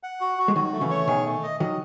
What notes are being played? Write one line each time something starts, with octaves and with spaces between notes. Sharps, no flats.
F#5
F#4
F#4
G#3
D#3 F#3 F#4
A3
C#3 E3
C#5
B2 D#3 G#4
A3
D#5
D#3 F#3 D#5